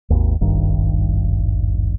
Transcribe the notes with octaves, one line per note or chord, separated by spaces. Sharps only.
G#1 D#2
D#1 G#1 G2 D#3